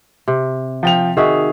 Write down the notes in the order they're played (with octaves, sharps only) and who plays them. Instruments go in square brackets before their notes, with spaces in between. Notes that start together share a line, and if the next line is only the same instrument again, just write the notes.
[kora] C3
[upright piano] F3 G5 F7
[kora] D#3 F#4 E5 [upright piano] G#4